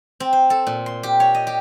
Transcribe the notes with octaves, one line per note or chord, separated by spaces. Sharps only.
C4
C5
A4
A#2
C6
G4
C#5
D#5
G4